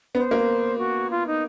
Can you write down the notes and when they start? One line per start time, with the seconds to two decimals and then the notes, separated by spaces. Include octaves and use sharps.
0.15 B3 C5
0.31 A#3
0.78 F#4
1.10 F4
1.27 D#4